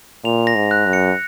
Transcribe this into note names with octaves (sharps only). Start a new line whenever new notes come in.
A#2 F7
A#6
G#2
F#6
F#2
C#7